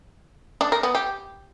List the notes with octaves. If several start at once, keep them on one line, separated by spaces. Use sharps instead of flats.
D4
A#4
B3
G4